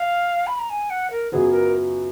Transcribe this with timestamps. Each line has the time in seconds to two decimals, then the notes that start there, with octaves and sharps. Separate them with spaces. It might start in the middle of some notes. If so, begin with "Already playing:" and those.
Already playing: F5
0.47 B5
0.59 A#5
0.70 G#5
0.90 F#5
1.11 A#4
1.32 F#2 C#3 F#3 B3 F4 G#4
1.52 A#4